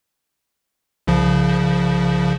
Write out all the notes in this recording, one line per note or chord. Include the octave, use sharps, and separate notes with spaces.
C2 C#3 F3